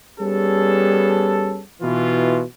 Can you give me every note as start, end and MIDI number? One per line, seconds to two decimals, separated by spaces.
0.20 1.61 55
0.20 1.61 59
0.20 1.61 61
0.20 1.61 68
0.20 1.61 69
1.82 2.41 47
1.82 2.41 52
1.82 2.41 65